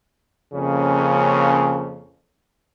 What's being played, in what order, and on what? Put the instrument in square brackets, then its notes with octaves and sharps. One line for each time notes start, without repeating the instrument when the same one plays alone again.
[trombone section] F2 C#3 A#3 C#4